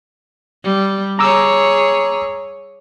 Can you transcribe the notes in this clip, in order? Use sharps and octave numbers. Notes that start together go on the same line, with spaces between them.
G3
G#4 C#5 A#5 D6 E6